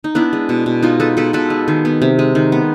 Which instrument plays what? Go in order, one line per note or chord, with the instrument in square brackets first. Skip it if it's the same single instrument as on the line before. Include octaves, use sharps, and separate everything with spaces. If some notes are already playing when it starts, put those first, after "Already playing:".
[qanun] D#4
B3 D4 E4
G#3
B2
B2
B3 D#4 F4
G#3 A4 B4
B2 A4 B4
B2 A4 B4
G#3
D#3
B3
C3
G#3
D#3
B3